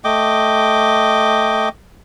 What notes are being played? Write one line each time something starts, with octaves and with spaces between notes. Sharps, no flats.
A3 D#5 G5 D6